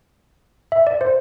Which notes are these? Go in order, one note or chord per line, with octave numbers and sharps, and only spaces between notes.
E5
D5
C5